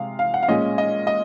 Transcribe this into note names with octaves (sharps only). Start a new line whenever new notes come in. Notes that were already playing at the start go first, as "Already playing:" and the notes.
Already playing: C3 G#3 F5
F5
F#5
F5
A#2 G#3 C#4 D#5
D#5
D#5